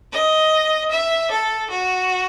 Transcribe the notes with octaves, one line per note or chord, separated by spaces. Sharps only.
D#5
E5
A4
F#4